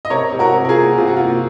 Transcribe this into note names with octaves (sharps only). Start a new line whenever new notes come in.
D#5
C3 A#4 C#5
C3
F#4 A#4
C3
A#4
F4 G#4
A#3
C3 F4
F#4
A#3 F4